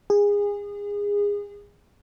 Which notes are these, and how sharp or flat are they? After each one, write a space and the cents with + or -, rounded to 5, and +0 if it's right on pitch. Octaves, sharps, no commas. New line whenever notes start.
G#4 -25